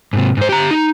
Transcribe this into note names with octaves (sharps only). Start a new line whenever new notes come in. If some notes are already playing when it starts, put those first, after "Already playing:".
G#2 C3
G#2 C5
G4 A#5
D#4